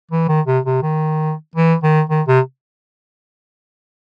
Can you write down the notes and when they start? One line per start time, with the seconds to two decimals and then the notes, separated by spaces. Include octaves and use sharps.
0.11 E3
0.28 D#3
0.46 C3
0.66 C3
0.82 D#3
1.55 E3
1.83 D#3
2.09 D#3
2.27 C3